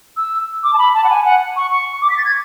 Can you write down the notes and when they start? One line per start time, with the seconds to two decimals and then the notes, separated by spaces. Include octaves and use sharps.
0.17 E6
0.63 D6
0.73 A5
0.78 B5
0.95 A5
1.04 F#5
1.10 G#5
1.25 F#5
1.56 C#6
1.71 C#6
2.02 D6
2.10 B6
2.17 A6
2.25 G#6